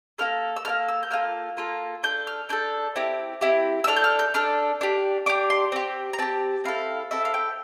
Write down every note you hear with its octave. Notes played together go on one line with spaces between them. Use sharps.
A#3 E4 A4 F6
E6
A#3 E4 A4 F6
E6
G6
A#3 F4 A4 F6
A#3 F4 A4
D4 A4 G6
F6
D4 A4 G6
C4 E4 G4
C4 E4 G4
E6
D4 A4 F6
G6
F6
G6
D4 A4 F6
D4 G4
D4 G4 D6
C6
C4 G4
A#5
C4 G4 A5
C4 E4 A4 F5
C4 E4 A4 E5
F5
G5